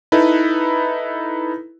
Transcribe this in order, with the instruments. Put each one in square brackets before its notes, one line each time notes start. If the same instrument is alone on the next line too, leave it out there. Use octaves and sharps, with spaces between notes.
[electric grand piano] D#4 E4 A4 B4